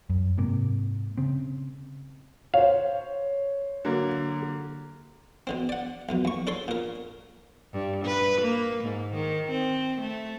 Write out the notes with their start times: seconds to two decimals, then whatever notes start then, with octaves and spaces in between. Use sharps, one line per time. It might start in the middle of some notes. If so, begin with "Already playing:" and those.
0.10 F#2
0.38 G#2 C3 A#3
1.18 C#3 C4
2.54 C5 C#5 F5
3.85 D3 F#3 A#3
5.47 B2 D3 C4
5.69 D5 F#5
6.09 B1 F2 B2
6.25 D#2 C#6
6.47 D4 A4 C#5 C6
6.68 A#2 A#4
7.73 G2
8.05 B4
8.41 A#3
8.84 G#2
9.15 D#3
9.51 C4
10.01 A3